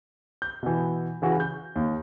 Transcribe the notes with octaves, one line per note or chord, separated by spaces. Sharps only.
G6
B2 E3
C#3 E3 F#4
G6
D#2